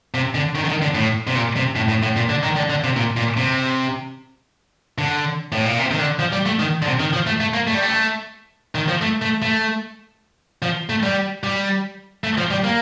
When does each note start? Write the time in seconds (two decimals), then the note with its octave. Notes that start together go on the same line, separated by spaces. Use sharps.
0.14 C3
0.35 D3
0.55 D#3
0.64 D3
0.69 D#3
0.82 D3
0.95 A2
1.27 C3
1.35 A#2
1.56 C3
1.76 A2
1.89 A2
2.03 A2
2.16 A#2
2.30 D3
2.43 D#3
2.56 D3
2.70 D3
2.84 C3
2.96 A#2
3.17 A#2
3.37 C3
4.98 D3
5.52 A2
5.65 A#2
5.79 C3
5.91 D#3
5.99 D3
6.19 F3
6.32 G3
6.46 A3
6.60 D#3
6.82 D3
6.87 C3
7.00 D#3
7.13 F3
7.27 A3
7.40 A3
7.54 A#3
7.67 A3
7.74 G3
7.82 A3
8.75 D#3
8.88 F3
9.02 A3
9.22 A3
9.42 A3
10.62 F3
10.89 A3
11.03 G3
11.44 G3
12.24 A3
12.38 F3
12.51 G3
12.64 A#3